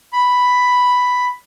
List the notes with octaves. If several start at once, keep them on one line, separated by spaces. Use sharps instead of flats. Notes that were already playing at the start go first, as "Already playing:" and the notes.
B5